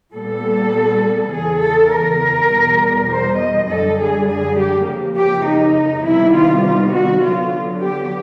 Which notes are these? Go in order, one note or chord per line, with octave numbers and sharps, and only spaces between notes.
A#2 G3 B3 A4
E2 C#3 E3 G#4
A4
A#4
E2 B2 G3
C5
D#5
F#2 D3 G3 A4
G#4
G#4
G4
F2 C#3 F3 A#3
G4
D#4
C3 D#3 G3 B3 E4
F4
F4
F#4
D3 F#3 B3 F4
G4